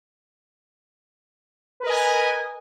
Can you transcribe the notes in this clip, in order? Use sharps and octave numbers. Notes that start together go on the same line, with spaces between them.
A#4 B4 D#5 G#5